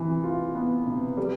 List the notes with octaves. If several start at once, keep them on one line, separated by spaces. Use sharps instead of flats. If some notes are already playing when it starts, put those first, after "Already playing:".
Already playing: C3 E3
F4
B3
C3
G3